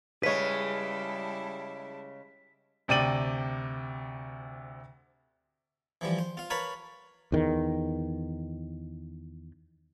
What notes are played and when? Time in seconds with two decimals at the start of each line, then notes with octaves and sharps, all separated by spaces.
0.23 C#3 G3 G#3 E4 B4 C#5 A5 B6
2.88 D2 C3 D5 G5 D#7 F#7
6.01 E3 F3 G3
6.18 C5
6.37 F4 F5
6.50 A#4 B4 C#5 F5 A5 B5
7.32 E2 D#3